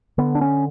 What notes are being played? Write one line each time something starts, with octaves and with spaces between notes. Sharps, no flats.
D3 B3
D4
C#4